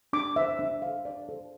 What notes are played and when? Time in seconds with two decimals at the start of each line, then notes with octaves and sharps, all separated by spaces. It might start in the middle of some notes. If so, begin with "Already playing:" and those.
0.13 D4 D6
0.36 A4 C5 E5
0.59 D4 E5
0.82 A4 C5 F5
1.05 D4 D5
1.29 A4 C5